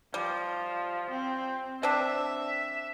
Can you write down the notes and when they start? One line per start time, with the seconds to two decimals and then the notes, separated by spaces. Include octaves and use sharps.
0.14 F3 G3
1.10 C4
1.83 C4 D4 E5